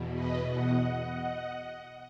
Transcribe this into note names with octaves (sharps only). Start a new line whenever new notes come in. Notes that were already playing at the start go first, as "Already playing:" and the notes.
Already playing: E2 B2
B4 D#5
D#5 F#5